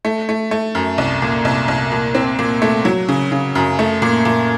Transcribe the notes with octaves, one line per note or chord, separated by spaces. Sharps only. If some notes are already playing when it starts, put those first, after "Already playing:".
A3
A3
A3
F#2
C2
A#2
C2
C2
A#2
C4
A#2
A3
F#3
C#3
C#3
F#2
A3
A#2
A#2